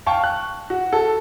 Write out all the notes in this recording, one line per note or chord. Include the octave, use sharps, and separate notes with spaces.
F5 G5 A5 C#6
F#6
F#4
A4